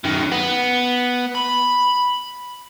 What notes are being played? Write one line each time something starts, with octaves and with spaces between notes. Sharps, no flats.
F#2 D#3
B3
B5